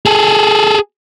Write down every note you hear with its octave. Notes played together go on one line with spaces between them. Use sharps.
G#4 A4